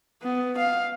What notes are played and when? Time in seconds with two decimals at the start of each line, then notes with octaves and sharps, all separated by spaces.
0.22 B3
0.58 F5